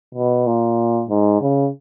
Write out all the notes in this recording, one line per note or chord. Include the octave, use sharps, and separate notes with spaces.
B2
A#2
G#2
C#3